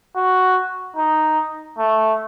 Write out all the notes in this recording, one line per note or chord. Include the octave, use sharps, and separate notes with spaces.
F#4
D#4
A3